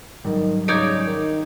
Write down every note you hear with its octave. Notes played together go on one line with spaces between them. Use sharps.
G#2 D#3 F#3 G3
C#3 D#4 C#5 D5 G6 G#6 D7
D#3